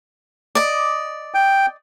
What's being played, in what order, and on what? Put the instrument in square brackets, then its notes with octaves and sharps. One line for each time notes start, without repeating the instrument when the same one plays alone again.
[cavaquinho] D5 D#5
[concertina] G5